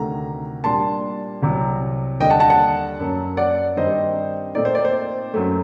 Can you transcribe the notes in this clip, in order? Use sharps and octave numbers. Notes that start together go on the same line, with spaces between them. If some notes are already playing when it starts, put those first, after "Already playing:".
Already playing: D2 C3 D#3 A3 A#5
A#2 G3 D4 A5 C6
C2 C3 F#3
D#2 D3 G3 D4 D#5 G5
F#5 A5
F#5 A5
F#5 A5
F#2 F#3 A#3
D5 F#5
G2 D#3 G3 C4 D#4 C5 D#5
A#2 A3 C4 D#4 D5
C5
D5
C5
F#2 F#3 A3